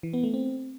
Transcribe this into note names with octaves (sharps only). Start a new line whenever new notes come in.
E3
B3
A3
C4